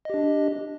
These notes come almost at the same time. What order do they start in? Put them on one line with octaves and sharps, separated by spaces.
D#5 G4 D4